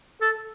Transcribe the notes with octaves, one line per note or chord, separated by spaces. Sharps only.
A4